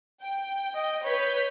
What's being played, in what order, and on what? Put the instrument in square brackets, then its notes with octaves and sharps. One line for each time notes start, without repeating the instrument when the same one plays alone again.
[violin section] G5
[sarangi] D#5
[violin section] B4 G6 B6 [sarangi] C#5